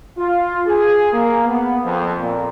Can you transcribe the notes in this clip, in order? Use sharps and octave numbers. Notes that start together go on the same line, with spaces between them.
F4
G#4
A#3
B3
F2
A#2